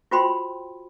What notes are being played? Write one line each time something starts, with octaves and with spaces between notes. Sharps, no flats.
F4 F#4 C5 G5 B5 C6